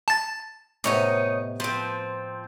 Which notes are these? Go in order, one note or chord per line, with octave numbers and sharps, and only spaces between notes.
A5 A6
A2 C3 B3 D#4 C#5 D#5
F3 C4 B4 C6